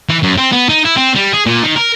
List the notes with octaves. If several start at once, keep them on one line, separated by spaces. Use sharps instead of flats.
E3
F#2
C4
B3
D#4
E4
C4
G3
G#4
A#2
D#3
A#4